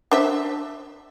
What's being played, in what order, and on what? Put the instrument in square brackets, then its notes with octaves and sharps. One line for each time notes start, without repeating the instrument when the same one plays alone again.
[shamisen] D4 C5 E5